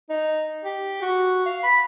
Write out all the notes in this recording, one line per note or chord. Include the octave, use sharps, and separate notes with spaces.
D#4
G4
F#4
F5
B5